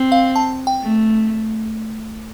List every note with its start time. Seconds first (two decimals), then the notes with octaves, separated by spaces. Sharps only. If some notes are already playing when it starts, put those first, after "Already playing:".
Already playing: C4
0.12 F5
0.36 A5
0.67 G5
0.82 A3